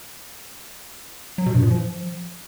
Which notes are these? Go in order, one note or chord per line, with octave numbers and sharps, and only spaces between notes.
F#3
B2
G2
A#2
F3